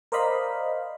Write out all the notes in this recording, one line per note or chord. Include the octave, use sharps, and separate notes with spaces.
A#4 C5 D5 D#5 F5 B5